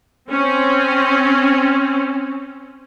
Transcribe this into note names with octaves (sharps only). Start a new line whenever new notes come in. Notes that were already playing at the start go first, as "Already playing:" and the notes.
C4 C#4